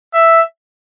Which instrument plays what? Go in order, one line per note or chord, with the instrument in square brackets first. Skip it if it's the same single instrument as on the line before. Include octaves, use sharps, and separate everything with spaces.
[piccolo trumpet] E5